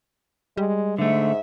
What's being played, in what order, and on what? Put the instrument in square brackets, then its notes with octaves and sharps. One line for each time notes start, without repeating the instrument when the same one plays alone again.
[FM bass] G3 [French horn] G#3
[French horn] G#2 [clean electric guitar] D3 A3 [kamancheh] E5